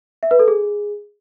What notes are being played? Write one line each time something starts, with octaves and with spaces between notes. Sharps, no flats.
E5
B4
A4
G#4